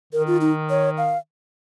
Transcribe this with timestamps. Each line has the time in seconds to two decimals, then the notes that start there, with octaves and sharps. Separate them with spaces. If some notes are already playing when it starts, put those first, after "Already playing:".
0.13 D#3 A#4
0.27 F4
0.41 D#4
0.70 C#5
0.98 F5